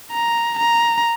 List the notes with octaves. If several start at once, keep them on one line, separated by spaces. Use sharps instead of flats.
A#5
A#5